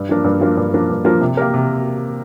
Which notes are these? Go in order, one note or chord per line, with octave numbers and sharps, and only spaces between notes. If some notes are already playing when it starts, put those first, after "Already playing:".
Already playing: G2
F3 A#3 D4 A#4
G2
F3 A#3 D4 A#4
G2
F3 A#3 D4 A#4
G2
F3 A#3 D4 A#4
C3
A#3 G4 A#4
C3